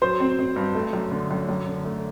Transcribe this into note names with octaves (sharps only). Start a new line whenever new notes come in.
F#3 C5 C6
C4
C4
G2
A3
F#2
D3
F#2
F#2
D3
A3